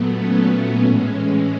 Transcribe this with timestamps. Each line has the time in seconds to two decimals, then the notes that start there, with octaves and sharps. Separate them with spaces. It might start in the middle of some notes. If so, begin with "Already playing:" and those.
Already playing: A#2 F#3 A3 B3
0.16 C#4
0.85 A2 E3 G#3